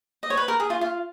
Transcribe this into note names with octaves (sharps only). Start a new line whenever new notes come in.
D#5
C#5
B4
A#4
G#4
F4
F4